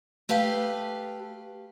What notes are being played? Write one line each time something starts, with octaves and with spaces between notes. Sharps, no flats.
A3 G4 B4 F5